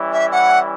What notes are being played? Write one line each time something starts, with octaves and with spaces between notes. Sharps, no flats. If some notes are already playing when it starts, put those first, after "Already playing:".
Already playing: E3 G3 C#4 E4
E5
F#5